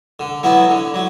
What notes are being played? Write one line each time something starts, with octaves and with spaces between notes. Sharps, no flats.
D3
F#3 B3 E4
D3
F#3